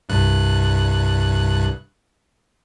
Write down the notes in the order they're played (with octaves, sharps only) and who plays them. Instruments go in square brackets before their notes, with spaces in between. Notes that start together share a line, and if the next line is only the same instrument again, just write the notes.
[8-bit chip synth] C2 G2 F#6